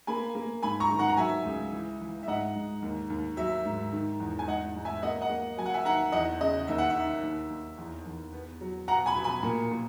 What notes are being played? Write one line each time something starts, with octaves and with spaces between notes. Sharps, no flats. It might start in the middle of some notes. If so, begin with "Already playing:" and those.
A#3 G#5 B5
A#3
G#2 G#5 B5
A#5 C#6
D#3
F#5 A#5
A#5
F#3 E5 G#5
C#2
E3
E3
E5
G#2 D#5 F#5
G#2
D#2
D#2
F#3 E5
G#2
D#3
E2
G#5
G#2 D#5 F#5
G#2
E5 G#5
A#3 D#5 F#5
D#5 F#5
A#3
F#3 G#5
F#5
E5 G#5
D#3 F#5 A#5
E2 D#5 F#5
C#3 D#5
D#2 E5
F#5
E5
D#3
D#2
D#2
E2
E2
B3
F#3
B2 F#5 A#5
G#5 B5
B2
G#5 B5
A#2
A#2